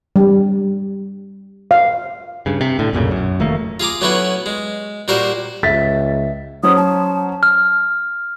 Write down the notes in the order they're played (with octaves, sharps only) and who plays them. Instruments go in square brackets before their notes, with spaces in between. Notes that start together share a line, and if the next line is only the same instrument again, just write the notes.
[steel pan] G3
F5
[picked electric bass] G2 C#3
C3
A2 D3
B1 F#2 A#2 C#3
F#2
F1 D#3 A3 A#3
[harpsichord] F4 G#4 A#5 D6
F#3 A3 B3 C#4 E4 F#5
G#3
A#2 G3 F#4 A#4 C5
[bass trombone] C#2 [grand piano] E5 A6 B6
[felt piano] F#3 C#4 C5 [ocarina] D#6
[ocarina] A5
[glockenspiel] F6